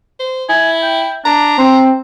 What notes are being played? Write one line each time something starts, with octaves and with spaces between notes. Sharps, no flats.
C5
E4 G#5
G5
D4 A#5
C4 C6